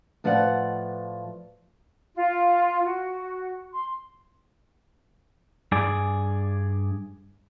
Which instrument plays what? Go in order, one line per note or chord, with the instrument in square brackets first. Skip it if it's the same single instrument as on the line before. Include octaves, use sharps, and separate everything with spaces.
[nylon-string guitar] A2 F3 B4 D5 F#5
[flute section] F4
F#4
C6
[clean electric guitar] G2 G#4 D5